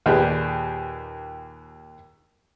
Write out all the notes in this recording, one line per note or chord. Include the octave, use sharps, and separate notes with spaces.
D#2 A#2 D#3 G4 G#4 B4